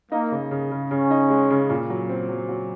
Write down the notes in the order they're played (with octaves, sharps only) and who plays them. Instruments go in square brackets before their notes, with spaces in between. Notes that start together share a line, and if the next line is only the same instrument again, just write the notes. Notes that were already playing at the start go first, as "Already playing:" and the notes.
[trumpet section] A#3 [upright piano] D#4
[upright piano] C#3
C#3
C#3
[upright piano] C#3 [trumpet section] C#4
[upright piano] D#4
G#3
C#3
A#2
F#3
C4
F#3
F#3